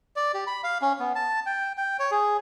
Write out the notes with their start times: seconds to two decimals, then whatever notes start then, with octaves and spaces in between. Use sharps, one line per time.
0.16 D5
0.34 G4
0.47 B5
0.64 F5
0.82 C#4
1.00 B3
1.15 A5
1.46 G5
1.77 G5
1.99 C#5
2.11 G#4